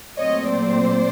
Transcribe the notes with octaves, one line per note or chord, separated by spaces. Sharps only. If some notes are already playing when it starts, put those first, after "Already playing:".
A#2 F#3 A3 C4 C#5 D#5
C5 D5